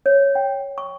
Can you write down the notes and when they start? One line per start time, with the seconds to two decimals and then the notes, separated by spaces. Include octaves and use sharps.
0.06 C#5
0.35 G5
0.78 C#6